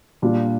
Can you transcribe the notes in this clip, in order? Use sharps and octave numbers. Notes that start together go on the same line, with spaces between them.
A#2 G3 D4 F4